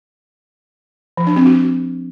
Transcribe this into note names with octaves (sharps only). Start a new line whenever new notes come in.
F3
D4
C4
F#4